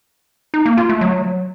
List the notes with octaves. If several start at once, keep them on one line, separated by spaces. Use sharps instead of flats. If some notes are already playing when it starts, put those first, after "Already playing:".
D#4
A#3
F4
A3
F#3